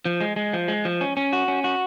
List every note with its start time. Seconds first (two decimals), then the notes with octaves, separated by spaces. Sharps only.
0.05 F3
0.21 G#3
0.36 G#3
0.53 F3
0.68 G#3
0.85 F3
1.01 C#4
1.17 C#4
1.33 F#4
1.48 C#4
1.64 F#4